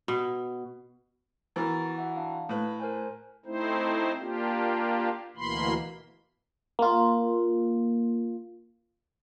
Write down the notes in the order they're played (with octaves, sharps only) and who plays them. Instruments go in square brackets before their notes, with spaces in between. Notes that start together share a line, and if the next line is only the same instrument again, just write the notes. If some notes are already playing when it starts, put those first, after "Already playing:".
[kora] B2
[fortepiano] E3 A#4 [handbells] B3 F#4 A6
[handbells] F#4 E5 F#5
D4 F5
[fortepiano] A2 B4
[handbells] A#4 C5 G#5
[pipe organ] A3 C4 D#4 E4 C5
A#3 D4 F4 G4
D2 B2 E3 A#3 B5 C6
[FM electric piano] A#3 F4